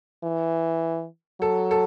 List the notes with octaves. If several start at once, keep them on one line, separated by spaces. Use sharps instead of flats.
E3
F#3 A4
A4